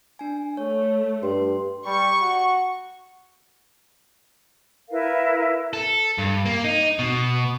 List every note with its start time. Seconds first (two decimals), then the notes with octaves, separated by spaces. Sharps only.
0.19 D4 G#5
0.57 A3 C#5
1.23 G2 C6
1.86 G3 C#6
2.22 F#4
4.89 E4 A#4 B4 F5
5.73 A4
6.18 G2
6.46 A#3
6.64 D#4
6.99 B2